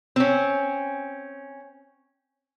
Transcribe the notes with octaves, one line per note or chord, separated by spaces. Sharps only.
C4 C#4